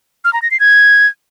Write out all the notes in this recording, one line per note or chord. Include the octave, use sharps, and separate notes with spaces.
F6
A#5
A#6
C7
G#6